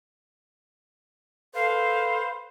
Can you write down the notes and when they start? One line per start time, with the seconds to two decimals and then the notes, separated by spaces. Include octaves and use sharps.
1.55 A4 B4 C5 F5